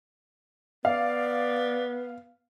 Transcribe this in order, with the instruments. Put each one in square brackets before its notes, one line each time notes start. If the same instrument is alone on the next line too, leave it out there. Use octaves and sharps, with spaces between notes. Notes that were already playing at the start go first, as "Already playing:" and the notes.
[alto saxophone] B3 [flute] D5 [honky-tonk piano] F5